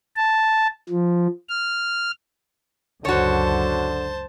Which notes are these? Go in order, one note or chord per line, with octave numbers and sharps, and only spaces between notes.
A5
F3
F6
C#2 F#2 D3 F#4 C5 C#5 A5